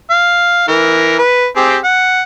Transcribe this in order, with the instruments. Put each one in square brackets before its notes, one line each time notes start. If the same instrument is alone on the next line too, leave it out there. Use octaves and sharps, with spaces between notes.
[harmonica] F5
E3 A#4
B4
C4 G4 G#4
F#5